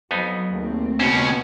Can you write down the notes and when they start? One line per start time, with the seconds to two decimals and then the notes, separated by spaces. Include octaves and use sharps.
0.11 F2 F#3 B3 D#4
0.52 G#1 D#2 A3 C4
1.00 C#2 B2 C#4 C5